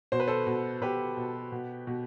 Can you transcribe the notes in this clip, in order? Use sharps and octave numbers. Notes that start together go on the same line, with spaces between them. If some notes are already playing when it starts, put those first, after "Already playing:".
B2 C5
B4
A4 C5
B2
B2 G4 B4
B2
B2
B2